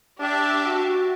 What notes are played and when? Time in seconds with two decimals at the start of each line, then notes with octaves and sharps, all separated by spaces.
0.20 D4 G4 E5
0.66 F#4